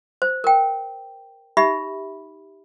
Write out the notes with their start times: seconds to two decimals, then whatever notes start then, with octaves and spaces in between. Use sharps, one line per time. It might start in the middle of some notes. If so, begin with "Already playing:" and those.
0.22 C5
0.44 A#4 G5
1.57 D#4 G4 E5 B5